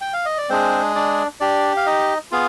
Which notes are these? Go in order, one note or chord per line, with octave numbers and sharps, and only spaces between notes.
G5
F5
D#5
D5
G#3 C4 D4 G#4 C5
D4 D5
D4 G4 D5
F5
D#4 D#5
B3 F4 G#4 F5